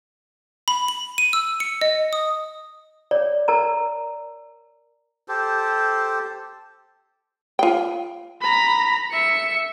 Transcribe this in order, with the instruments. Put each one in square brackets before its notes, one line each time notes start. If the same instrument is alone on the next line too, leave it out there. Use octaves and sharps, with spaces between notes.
[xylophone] B5
F#7
D#7
E6
C#7
D#5
D#6
[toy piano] C#5 [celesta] D5
[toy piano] A#4 A5 A#5
[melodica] G4 A4 C5
[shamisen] F4 G5
[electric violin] A#5 B5
E5 C#7